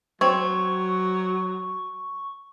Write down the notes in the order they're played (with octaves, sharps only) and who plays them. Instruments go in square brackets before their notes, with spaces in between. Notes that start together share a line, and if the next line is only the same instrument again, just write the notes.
[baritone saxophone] F#3 [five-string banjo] C4 C#5 [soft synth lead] C#6